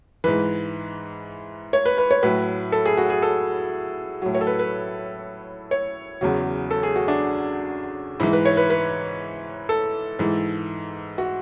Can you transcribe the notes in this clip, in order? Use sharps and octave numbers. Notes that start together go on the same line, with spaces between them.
G#2 E3 B4
C#5
B4
B4
C#5
A2 F#3 B4
A4
G#4
F#4
G#4
A4
A2 F#3
C#5
A4
B4
B4
C#5
E2 C#3 F#3
A4
G#4
F#4
D4
G#2 E3 E4
B4
C#5
B4
B4
A4
G#2 E3
F#4